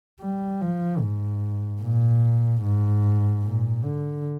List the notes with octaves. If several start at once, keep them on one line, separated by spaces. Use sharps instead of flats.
G3
F3
G#2
A#2
G#2
A#2
D3